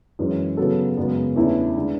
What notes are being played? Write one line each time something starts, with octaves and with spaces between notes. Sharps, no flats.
F#2 E3 G#3 C#4
C#3 F#3 B3 F#4 A4
F#2 C#3 G#3 B3
E2 D3 A3 C#4 E4
D3 G#3